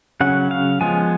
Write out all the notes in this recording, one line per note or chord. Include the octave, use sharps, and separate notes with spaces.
C#3 F#3 C#4 F#5
F5
F3 G#3 B3 G#5